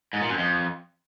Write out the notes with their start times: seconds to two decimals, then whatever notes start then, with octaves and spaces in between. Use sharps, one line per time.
0.13 G#2
0.21 A#2
0.29 F#2
0.37 F2